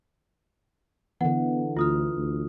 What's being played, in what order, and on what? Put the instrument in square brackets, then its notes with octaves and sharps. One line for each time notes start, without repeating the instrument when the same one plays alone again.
[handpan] D3 E3 [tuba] B3 [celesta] F#5
[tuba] D2 [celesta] F4 D#6 F6
[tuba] D2